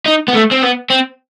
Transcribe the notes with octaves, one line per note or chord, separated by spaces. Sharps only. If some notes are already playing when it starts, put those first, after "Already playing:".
D#4
B3
A3
C4
B3
C4